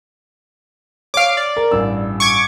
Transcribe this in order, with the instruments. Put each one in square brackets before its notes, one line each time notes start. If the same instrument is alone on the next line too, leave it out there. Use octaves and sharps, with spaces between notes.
[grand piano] C#5 [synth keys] F5 D6
[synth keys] D5
[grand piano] A#4
A1 G2 E6
[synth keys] C#6 D6 G#6